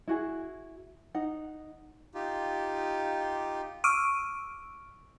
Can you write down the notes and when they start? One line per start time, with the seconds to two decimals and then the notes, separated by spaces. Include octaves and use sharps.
0.08 E4 F#4 G#4
1.15 D#4 F#5
2.15 D#4 F4 G4
3.84 C#6 D6 E6 F6 D7 D#7